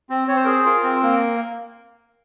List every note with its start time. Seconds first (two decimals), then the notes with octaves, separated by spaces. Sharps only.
0.10 C4
0.28 C4 C#5
0.36 C5
0.44 G#4 A#4
0.52 C5
0.65 F4 A#4
0.84 C4
1.03 A#3 A#4